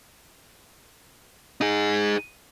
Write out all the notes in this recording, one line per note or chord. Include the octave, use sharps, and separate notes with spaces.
D#4 G#4